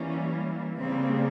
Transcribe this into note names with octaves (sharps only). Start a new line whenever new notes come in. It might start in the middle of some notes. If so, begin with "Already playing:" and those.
Already playing: E3 G3 A#3 C#4
C#3 G3 A#3 C4